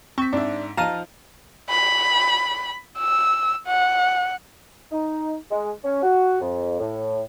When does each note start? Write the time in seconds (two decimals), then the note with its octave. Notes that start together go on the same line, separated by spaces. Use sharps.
0.18 C4 C#6 B6
0.33 G#2 D4 E5
0.77 F3 D#4 F5 A5 A#5 D#7
1.70 B5
2.98 E6
3.67 F#5
4.92 D#4
5.51 G#3
5.84 C#4
6.03 F#4
6.41 F2
6.80 A2